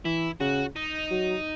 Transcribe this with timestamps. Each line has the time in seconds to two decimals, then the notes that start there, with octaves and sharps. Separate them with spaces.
0.05 E3 E4
0.40 C#3 F#4
0.76 D#4
1.11 F#3